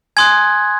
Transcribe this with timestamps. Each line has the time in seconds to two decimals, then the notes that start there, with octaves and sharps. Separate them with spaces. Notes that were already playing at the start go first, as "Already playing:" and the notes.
0.17 G#5 C6 D#6 F#6 G#6